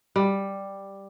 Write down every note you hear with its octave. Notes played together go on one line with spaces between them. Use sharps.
G3